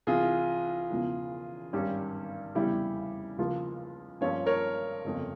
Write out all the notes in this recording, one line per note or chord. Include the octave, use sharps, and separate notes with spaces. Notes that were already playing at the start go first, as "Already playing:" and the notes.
C2 C3 E3 F4 G#4
E1 E2 C#3 F3
G#1 G2 G3 C#4 G4
F1 E2 C#3 G3 E4 G4
C#2 C#3 F3 A#3 F4
G2 F3 A#3 C#4 F4 C#5
A#4 C#5
G1 F2 C#3